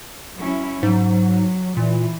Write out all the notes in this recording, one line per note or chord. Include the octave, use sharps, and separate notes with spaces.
F#3 C#4 E4
G#2 F#3
A#2 E3